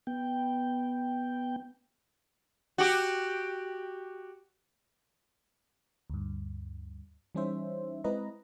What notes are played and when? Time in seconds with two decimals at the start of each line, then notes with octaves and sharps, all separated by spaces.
0.07 B3 G5
2.78 F#4 G4
6.10 D2 G2
7.35 E3 G3 C#4 D#4 C5 E5
8.04 G#3 C4 E4 B4 D#5 A#5